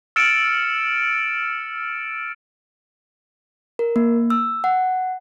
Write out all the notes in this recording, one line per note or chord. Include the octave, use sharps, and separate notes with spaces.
E6 F6 A6 C#7 D7 E7
A#4
A#3
E6
F#5